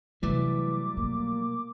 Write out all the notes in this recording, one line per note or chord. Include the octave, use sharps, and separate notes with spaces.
C3 E3 F#3 G3 A3 D6
B2 A#3